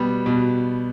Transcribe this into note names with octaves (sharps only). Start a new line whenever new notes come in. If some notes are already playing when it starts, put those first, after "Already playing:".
Already playing: B2 G3 B3
B2